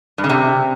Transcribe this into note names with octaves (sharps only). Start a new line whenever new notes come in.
G2
C#3
C3